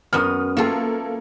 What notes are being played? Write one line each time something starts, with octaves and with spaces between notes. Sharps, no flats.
F#2 B3 D#6 F6
A3 A#3 F4 A4